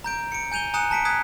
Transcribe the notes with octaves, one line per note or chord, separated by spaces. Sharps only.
A#5 G6 D7
C#7 D7
G#5 G6 D#7 F7 G7
G#5 A#5 D#6 F#6 C#7 E7
A5 A#5 B6 C#7 D7
D#6 F#6 G#6 B6